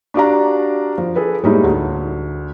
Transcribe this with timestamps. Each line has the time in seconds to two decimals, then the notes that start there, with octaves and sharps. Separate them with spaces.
0.14 D4 F#4 G4 D5 F5 A#5
0.98 F3
1.15 G#4 A4 B4
1.43 A2 G3 G#3 A#3 D#4 E4
1.64 D2